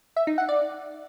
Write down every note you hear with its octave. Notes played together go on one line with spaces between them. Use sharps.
E5
D#4
F#5
D5